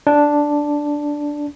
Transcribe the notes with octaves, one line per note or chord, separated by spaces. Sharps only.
D4